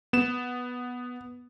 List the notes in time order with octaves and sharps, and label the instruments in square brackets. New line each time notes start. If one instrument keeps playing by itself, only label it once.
[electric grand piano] B3 E7